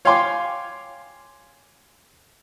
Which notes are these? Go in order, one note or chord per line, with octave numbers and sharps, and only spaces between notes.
C#5 F5 G5 G#5 C6 D6